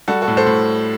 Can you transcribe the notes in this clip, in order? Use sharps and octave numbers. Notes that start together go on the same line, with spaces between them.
G3 F#4 A4
F#4 A4
A2
A4 C5
A2